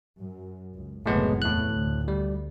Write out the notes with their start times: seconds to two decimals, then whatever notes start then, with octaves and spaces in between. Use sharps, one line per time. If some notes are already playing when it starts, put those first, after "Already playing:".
0.18 F#2
0.74 C#2
1.06 F#1 C#2 A2 C3 G#3 B3
1.42 E2 A2 F#6
1.75 D2
2.08 G3